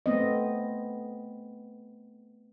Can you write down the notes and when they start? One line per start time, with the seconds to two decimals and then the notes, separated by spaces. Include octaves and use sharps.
0.06 A3 B3 C4 D#5